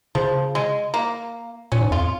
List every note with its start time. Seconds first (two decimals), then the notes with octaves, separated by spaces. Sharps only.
0.15 C#3 F3
0.55 G#3
0.94 A#3
1.72 A#2 C#4
1.81 G#2
1.91 F2 F4